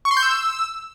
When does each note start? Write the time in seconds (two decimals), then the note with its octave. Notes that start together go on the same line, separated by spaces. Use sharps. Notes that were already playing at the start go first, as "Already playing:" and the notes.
0.05 C#6
0.11 C6
0.17 G6
0.23 E6